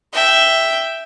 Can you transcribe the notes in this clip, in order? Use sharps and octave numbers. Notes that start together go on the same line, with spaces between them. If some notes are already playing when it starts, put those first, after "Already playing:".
E5 G5